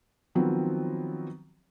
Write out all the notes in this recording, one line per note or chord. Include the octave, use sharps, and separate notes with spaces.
D#3 F3 F#3 B3 C4